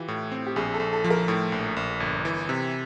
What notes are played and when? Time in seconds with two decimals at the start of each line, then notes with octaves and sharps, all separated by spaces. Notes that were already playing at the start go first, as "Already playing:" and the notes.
Already playing: E3 F4 G4
0.08 A2
0.32 C4
0.46 G4
0.56 A#1 G#4
0.74 A4
0.80 A#1
0.93 A4
1.04 F3
1.10 A#4
1.28 A2
1.52 A#1
1.76 A#1
2.00 G1
2.25 E3
2.49 C3